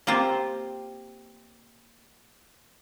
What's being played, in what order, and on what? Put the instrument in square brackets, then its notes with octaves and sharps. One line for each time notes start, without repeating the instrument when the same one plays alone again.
[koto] A#3 C4 F4 G4 C5